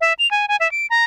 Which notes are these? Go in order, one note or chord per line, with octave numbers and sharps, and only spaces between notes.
E5
F7
G#5
G#5
E5
D7
A#5